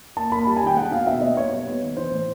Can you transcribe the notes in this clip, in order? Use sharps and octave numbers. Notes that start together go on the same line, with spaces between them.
A#3 A5
A#3 B5
G3 A5
G#5
D#3 G5
G#3 F#5
B2 F5
B2 E5
B3 D#5
B3 C#5
G3
B3
D#3
E3 C5
A2